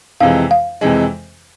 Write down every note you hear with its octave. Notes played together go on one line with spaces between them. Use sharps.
F2 C3 E3 G#3 F5
F5
F2 C3 E3 G#3